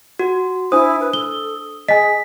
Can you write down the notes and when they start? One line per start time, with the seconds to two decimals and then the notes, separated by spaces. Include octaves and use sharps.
0.19 F#4
0.72 D4 E4 C5 D#6
1.00 B4
1.13 A4 G7
1.89 G#4 D#5 G#5 B6